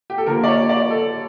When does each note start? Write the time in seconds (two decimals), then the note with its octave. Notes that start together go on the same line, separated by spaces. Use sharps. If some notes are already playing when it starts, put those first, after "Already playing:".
0.10 G4
0.18 A4
0.26 D3 F3 A#3 A#4
0.44 D5
0.48 C#5
0.69 D5
0.90 A4